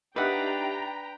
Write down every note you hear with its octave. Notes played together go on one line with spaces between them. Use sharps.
D4 D#4 G4 B4 E5 F#5 G5 A#5